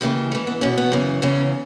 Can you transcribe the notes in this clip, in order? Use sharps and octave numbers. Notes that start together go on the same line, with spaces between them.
D#2 C#3 E3 A3
G#2 E3 A3
B3
E2 B2 C#4
B3
F#2 C#3 E3
E2 C#3 E3 C#4